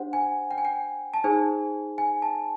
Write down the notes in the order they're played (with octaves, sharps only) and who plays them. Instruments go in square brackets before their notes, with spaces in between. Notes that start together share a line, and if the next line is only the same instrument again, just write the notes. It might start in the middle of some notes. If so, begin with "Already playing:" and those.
Already playing: [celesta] D4 G4 C5 F#5
G#5
G5
G#5
G5
A5
D#4 G#4 C5 G#5
G#5
A5